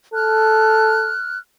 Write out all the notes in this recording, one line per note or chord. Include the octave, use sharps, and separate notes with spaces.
A4 F6 F#6